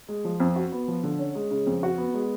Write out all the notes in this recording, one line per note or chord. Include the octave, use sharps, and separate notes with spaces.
G#3
F3
F2
F#4
B3
F3
D3
C#4
G#3
C#3
F2
F#4
B3
G#3